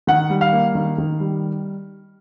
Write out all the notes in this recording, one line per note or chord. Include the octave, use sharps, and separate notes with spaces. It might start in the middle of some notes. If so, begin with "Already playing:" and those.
D#3 F#5
G3
F5
A#3
D#3
D#3
G3